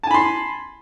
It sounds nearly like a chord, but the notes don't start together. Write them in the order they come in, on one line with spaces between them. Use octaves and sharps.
A5 G#5 B5 C6